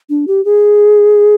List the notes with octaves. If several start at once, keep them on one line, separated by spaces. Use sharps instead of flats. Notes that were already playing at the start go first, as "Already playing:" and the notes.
D4
G4
G#4